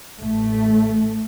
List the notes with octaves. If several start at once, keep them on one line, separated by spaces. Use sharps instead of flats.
A1 A2 A3